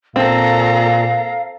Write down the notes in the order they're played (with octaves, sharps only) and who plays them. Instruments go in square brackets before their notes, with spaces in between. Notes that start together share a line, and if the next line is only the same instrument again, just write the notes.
[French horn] A#2 [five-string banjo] C4 [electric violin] A4 A#5 [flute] F5